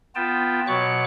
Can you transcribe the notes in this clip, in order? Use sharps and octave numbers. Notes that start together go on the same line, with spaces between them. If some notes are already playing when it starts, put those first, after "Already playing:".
B3 F4 G5 A5
B2 F#3 C#5 C#6 D6 F#6